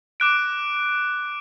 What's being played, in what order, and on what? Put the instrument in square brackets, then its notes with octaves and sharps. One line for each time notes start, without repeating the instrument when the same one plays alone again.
[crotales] D6 F#6 D7